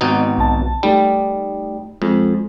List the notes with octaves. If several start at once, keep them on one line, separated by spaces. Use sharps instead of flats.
G#1 B2 D#4
B1 A5
G3 A3 D#4
F2 G#3